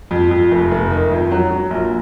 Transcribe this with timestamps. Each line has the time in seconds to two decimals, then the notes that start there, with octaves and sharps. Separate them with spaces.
0.11 F2
0.31 F2
0.51 F1
0.71 F1
0.91 D#3
1.11 F2
1.32 F#3
1.51 F#3
1.70 A#1